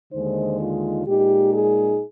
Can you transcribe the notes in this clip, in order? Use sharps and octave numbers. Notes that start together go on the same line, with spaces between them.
D#2 D3 G#3 D#4 C5
F4
A#2 G#3 D#4 G4
G#4